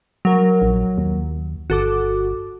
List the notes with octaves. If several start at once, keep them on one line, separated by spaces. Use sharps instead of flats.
F#3 A#4
A#1
D#2
G1 F#4 A4 D6